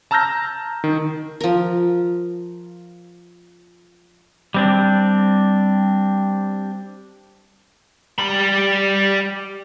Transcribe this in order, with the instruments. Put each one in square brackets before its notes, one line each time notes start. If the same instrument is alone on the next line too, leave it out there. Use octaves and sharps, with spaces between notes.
[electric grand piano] A5 A#5 E6 F6 G6 A#6
D#3
[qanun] F3 A#4
[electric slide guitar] G3 C4 D4
[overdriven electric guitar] G3 B5